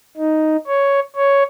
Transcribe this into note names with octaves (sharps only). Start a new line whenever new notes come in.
D#4
C#5
C#5